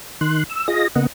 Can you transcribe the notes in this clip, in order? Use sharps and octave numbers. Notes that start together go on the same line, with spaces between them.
D#3 C6 F#6
E6
F4 G#4 D#5 A#6
C#3 A#3 B3 D#5 F#5